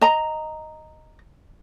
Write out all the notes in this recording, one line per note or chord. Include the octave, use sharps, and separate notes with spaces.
D#5 A#5